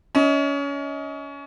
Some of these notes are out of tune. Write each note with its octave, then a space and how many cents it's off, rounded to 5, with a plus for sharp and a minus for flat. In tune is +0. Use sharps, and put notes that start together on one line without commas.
C#4 +25 D#5 +30